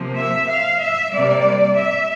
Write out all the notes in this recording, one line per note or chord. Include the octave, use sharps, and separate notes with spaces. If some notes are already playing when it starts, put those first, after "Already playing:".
Already playing: C3 F3 A#3
E5
F5
E5
C3 G3 A#3 D5
E5